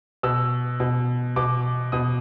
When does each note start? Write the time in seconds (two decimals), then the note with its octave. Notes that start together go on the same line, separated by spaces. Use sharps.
0.23 B2 E6
0.80 B2
1.36 B2 D6
1.92 B2 D#6